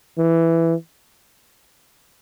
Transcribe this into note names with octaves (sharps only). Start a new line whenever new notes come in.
E3